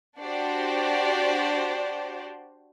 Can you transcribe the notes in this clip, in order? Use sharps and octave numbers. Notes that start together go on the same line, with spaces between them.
D4 F#4 G4 C5 D5